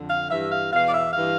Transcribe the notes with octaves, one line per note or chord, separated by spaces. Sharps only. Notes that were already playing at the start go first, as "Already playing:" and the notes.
Already playing: F2 D3
F5
G2 E3 E5
F5
E2 B2 F5
D5
E5
G2 E3 F5